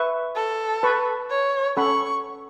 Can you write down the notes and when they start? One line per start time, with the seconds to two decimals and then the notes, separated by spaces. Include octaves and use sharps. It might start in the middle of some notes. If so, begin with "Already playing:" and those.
Already playing: B4 E5 C#6
0.35 A4
0.83 B4 A5 C#6
1.30 C#5
1.77 C#4 A4 F#5 B5 C#6